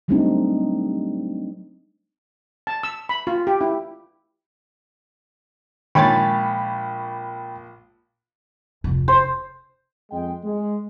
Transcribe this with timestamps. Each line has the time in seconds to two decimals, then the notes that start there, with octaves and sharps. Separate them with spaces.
0.08 F#3 G3 A3 C4 D4 D#4
2.67 A5
2.83 E6
3.09 B5
3.27 F4
3.47 G4
3.61 E4
5.95 A#1 D#3 G#3 C#5 G5 G#5 B5 A6
8.84 F1 D2
9.08 C5
10.11 F2 G#3 G5
10.44 G#3